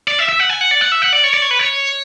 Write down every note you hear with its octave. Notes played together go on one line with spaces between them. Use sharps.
D5
E5
E5
F#5
G#5
F#5
D5
F#5
E5
F#5
D5
C#5
D5
C#5
B4
C#5